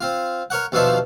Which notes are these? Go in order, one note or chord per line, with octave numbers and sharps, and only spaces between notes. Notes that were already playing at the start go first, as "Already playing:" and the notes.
C4 F4
A#4 C#5 F#5
D#2 B2 F3 D4 F4 E5